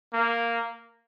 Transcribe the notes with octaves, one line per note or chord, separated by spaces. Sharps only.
A#3